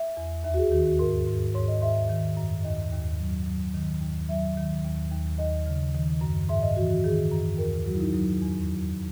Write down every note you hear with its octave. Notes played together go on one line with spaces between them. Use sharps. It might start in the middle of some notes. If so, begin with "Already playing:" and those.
Already playing: E5
E2
D#2 E5
F#4
G#4
D#3 F#4
F#4
G#2 A#4
G#2
G#2 C#5
D#5
G#2 E5
E5
D#3
F#2
D#2 D#5
D#2
F#3
F#3
D#3
D#2
F#3 E5
D#3
D#2
D#2
D#2 D#5
C#3
D#3
F#2
G#2 E5
D#5
E3 F#4
F#4
D#3 G#4
F#2
D#2 A#4
F#3 F#4
E4
D#4
F#3 D#4
E2
F#3